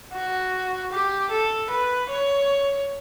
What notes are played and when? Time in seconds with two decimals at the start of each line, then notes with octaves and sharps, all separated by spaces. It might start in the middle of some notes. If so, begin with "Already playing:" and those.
0.13 F#4
0.92 G4
1.31 A4
1.70 B4
2.10 C#5